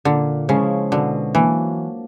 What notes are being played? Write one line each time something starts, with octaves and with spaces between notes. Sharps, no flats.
A#2 D3
C#3 F3 G#3 C#4 E4
B2 D3
E3 F#3 A#3 D4